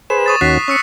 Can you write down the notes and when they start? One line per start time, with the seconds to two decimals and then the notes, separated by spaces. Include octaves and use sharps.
0.10 G#4 B4 C5 E7
0.26 C#6 D#6 A6
0.41 D#2 C#4 F#4 F#6 B6 C7
0.68 C#4 C#6 E6 C#7